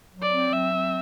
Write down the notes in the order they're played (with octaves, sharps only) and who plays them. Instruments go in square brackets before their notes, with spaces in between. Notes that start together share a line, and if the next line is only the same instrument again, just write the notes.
[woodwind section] F#3
[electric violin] D5
[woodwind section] C4
[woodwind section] F#3 [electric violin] E5
[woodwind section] C4